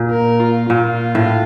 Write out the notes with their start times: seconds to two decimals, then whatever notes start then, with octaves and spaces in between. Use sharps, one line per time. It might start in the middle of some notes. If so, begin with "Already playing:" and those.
Already playing: A#2
0.10 A#4
0.40 F4
0.69 A#2 F4
1.15 A2